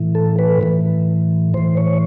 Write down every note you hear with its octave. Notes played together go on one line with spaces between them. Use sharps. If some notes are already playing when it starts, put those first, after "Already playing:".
Already playing: A2 E3
A4
B4
A2 E3
A2 E3 C5
C#5